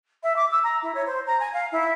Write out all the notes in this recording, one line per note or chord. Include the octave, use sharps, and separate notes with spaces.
E5
D6
E6
A#5
E4
C#5
C5
A#5
G#5
F5
E4